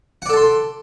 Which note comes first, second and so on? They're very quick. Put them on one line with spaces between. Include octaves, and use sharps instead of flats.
F#5 D5 A4 A5 C6